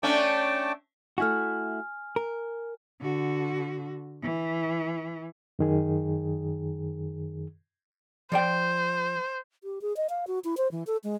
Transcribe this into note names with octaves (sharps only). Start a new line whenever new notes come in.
A3 C#4 D4 G5 A5 D6
A3 E4 F#4 G#5 F6
A#4
D3 F#4
E3
F#2 D#3 G#4
F3 C5 D5 G5
G4
G#4
D#5
F5
F#4
E4
C5
E3
A4
G#3